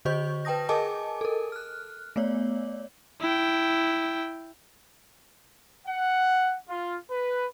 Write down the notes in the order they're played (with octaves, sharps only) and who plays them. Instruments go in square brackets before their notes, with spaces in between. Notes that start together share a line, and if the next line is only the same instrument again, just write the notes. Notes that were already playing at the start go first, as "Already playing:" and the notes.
[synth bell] D3 F#4 C5 D#5 C#6 G6
B4 G5 A5 D#6 A#6
G#4 A#4 D#5 G#5 A5 D6
A4 A#4
F6 F#6
A3 B3 C#5 D5
[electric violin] E4 G5
[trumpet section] F#5
F4
B4